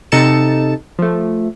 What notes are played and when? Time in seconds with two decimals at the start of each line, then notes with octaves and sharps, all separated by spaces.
0.12 C3 D#4 A4 A6 C#7 E7
0.99 F3 A3